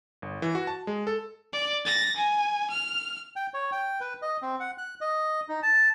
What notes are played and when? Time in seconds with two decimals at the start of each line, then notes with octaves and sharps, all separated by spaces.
0.22 G1
0.42 E3
0.55 F#4
0.67 A5
0.87 G#3
1.07 A4
1.53 D5
1.86 A6 A#6
2.16 G#5
2.71 F6
3.36 G5
3.54 C#5
3.72 G5
4.01 B4
4.22 D#5
4.42 C4
4.60 F#5
4.78 F#6
5.01 D#5
5.49 D#4
5.62 A5